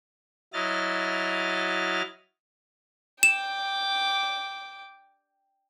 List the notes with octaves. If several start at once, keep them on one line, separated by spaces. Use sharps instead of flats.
F#3 E4 D#5 F6 A6
G5 D6 E7